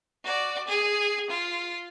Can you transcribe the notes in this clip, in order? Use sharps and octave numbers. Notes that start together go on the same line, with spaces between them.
F#4 D5
G#4
F4